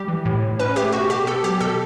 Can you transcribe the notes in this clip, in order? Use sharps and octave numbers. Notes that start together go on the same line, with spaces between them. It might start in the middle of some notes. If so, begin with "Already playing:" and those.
Already playing: G3 G4
E3
A2
A2
C#4 B4
A3 G4
B2 F#4
B2 G4
B3 A4
F#3 G4
B2 A4